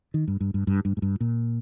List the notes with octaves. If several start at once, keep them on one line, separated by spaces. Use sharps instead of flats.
D#3
G2
G2
G2
G2
G2
G#2
G2
A#2